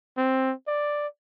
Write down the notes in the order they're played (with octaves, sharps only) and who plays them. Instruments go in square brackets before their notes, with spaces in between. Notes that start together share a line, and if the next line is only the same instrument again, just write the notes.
[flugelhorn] C4
D5